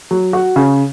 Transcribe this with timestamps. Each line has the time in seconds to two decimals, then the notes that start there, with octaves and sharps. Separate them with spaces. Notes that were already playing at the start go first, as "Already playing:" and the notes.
0.11 F#3
0.33 F#4
0.56 C#3